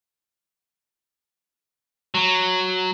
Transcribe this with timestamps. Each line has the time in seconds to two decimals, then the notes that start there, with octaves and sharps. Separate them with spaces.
2.15 F#3